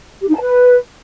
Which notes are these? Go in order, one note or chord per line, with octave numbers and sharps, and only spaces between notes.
G4
D#4
A5
B4